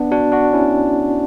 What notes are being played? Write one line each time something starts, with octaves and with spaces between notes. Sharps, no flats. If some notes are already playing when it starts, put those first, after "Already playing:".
Already playing: B3 D4
D4 F#4
D4 F#4
C#4 E4